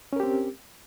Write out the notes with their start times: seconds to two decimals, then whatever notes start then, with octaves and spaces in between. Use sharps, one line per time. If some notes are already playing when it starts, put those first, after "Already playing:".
0.13 C#4
0.16 A#4
0.20 G4
0.23 C4